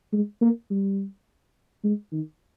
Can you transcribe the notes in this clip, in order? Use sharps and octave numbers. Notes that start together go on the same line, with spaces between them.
G#3
A#3
G3
G#3
D#3